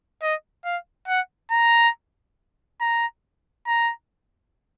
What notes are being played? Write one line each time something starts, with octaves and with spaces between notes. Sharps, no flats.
D#5
F5
F#5
A#5
A#5
A#5